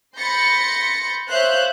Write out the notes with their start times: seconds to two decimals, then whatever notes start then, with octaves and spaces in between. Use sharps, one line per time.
0.18 B5 C6 G6 A6 A#6 C#7
1.30 C5 C#5 E5 F5 F#6 G6